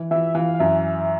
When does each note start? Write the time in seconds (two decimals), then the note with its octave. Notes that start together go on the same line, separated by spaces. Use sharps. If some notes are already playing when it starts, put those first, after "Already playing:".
Already playing: E3
0.11 E3 E5
0.35 E3 F5
0.54 F5
0.60 F#2 E5